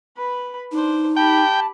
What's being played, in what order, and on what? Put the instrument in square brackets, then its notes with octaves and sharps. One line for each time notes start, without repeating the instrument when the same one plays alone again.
[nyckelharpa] B4 B5
[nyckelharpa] D4 C5 [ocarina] D#4
[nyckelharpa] G4 B5 [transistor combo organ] G5 [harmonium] A5